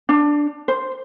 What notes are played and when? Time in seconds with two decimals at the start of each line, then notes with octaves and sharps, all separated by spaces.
0.09 D4
0.68 C5